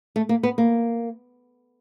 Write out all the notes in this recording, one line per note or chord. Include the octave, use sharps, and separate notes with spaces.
A3
A#3
B3
A#3